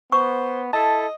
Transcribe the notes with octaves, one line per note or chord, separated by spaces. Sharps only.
B3 C5 C#6
E4 A4 D#5 A5